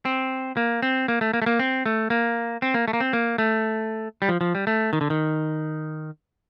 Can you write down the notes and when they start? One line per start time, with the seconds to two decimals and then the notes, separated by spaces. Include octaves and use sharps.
0.05 C4
0.57 A#3
0.82 C4
1.08 A#3
1.21 A3
1.33 A#3
1.42 A3
1.46 A#3
1.59 C4
1.86 A3
2.10 A#3
2.62 C4
2.74 A#3
2.88 A3
2.93 A#3
3.00 C4
3.13 A#3
3.38 A3
4.22 G3
4.29 F3
4.41 F3
4.55 G3
4.67 A3
4.93 D#3
5.01 D3
5.10 D#3